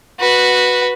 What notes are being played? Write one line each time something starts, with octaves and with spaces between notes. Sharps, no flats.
F#4 B4